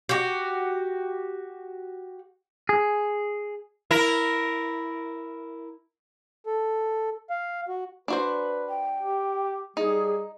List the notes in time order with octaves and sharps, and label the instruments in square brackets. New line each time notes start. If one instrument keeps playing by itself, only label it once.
[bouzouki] F#4 G4
[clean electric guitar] G#4
[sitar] E4 A#4
[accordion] A4
F5
F#4
[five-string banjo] D4 F#4 C5 [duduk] B4
[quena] G5
[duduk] G4
[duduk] G3 [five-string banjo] D#4 [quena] G#4